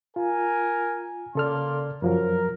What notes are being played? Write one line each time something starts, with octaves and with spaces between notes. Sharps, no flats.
F4 A#4 G#5
C#3 A#3 A4 D5 C6 F6
F#2 F3 F#3 A#4